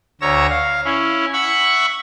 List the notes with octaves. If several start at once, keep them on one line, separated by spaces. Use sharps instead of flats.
D2 C#5 A#5 E6
F5
C#4 E4
E5 F#5 B5 C#6